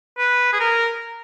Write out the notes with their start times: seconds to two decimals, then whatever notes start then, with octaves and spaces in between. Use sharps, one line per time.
0.18 B4
0.53 G#4
0.60 A#4